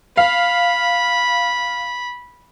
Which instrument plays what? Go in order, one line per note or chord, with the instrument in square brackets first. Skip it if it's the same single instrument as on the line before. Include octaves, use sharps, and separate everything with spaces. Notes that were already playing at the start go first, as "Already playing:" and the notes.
[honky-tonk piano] F5 [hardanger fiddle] B5